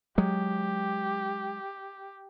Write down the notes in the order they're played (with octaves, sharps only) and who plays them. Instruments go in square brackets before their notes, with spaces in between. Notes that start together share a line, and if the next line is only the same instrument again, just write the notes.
[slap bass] F#3 G#3 [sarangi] G4